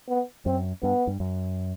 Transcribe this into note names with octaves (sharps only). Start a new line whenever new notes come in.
B3
F#2 C4
G2 B3
G2
F#2